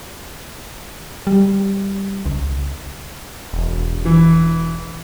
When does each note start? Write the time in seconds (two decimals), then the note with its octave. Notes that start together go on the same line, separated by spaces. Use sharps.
1.27 G3
2.26 C#2
3.53 E1
4.05 E3